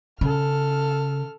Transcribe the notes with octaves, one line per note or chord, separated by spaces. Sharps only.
C#3 A4 F6